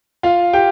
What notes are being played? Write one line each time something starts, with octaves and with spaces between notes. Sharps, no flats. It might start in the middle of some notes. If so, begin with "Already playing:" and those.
F4 F5
G4 G5